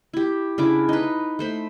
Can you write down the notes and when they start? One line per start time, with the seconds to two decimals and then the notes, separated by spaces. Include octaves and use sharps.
0.13 E4 G4
0.58 C#3 D4 E4 D6
0.89 D#4 B4
1.39 A3 C5 B5